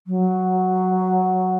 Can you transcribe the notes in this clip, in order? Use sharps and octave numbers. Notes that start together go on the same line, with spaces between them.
F#3